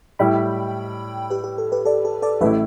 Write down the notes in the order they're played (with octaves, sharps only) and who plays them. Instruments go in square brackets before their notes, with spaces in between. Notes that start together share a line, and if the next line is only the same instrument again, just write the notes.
[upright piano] A2 G3 E4 [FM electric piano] G5 B5
[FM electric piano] G4 B4
G4
A4
G4 B4
A4 D5
A4
A4 D5
[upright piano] A1 A2 A3 E4 [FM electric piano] B4 E5